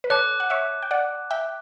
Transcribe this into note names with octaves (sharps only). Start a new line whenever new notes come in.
B4
A4 C#5 A5 D6 F#6
F#5
C#5 E5
G5
D5 F#5
E5 G5